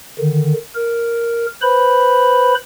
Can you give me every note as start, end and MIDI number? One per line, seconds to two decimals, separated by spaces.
0.19 0.54 50
0.19 0.54 51
0.75 1.46 70
1.62 2.54 71
1.62 2.54 72
1.62 2.54 83